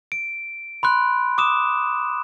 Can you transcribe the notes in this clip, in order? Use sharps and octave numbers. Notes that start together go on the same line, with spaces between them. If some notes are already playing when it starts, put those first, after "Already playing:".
D7
B5 C6 F#6
D6 D#6 E7